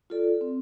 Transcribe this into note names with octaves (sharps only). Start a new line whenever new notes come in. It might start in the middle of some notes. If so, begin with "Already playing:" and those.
F4 A4 D5
C4